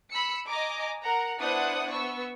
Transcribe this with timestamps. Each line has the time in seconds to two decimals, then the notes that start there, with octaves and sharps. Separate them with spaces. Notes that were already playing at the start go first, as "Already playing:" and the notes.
0.11 B5 E6 C#7
0.47 D#5 G#5 A#5 D6
1.02 A#4 F#5 A#5
1.40 B3 D4 E4 C5 F#5 D#6
1.92 B3 C#6 E6